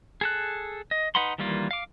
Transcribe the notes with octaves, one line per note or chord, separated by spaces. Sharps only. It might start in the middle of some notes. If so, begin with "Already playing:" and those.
G#4 A4 F#6
D#5
D#4 B4 F#5 B5 C6
D#3 E3 G3 A#3 F4
F5 D6